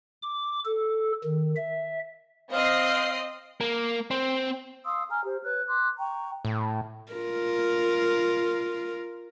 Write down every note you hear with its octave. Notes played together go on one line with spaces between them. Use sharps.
D6
A4
D#3
E5
C4 D#5 F5 C7
A#3
C4
F5 C6 D#6 E6
G#5 A#5 F6
G4 C5
B4 C#5 F#6
C6 D6 F#6
G5 A#5 C#6
A2
F4 A#4